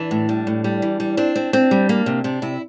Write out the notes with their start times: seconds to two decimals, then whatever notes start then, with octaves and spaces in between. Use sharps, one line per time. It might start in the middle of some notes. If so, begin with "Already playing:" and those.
Already playing: E3 D4
0.11 A2
0.29 G3
0.47 A2
0.64 G3
0.82 E3
1.00 G3
1.17 C4 D4
1.36 C4
1.53 C4
1.71 G3
1.89 A#3
2.06 C3
2.24 C3 D4
2.42 C3 E4